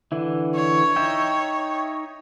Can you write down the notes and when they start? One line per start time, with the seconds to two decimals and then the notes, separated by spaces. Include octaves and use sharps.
0.12 D3 E3 E4
0.55 C#5
0.96 D#4 E5 G5